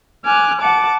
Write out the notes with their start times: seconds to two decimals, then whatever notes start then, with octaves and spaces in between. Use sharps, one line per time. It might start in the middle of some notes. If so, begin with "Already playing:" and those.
0.24 G#5 D6 F6 F#6
0.60 F#5 A5 D6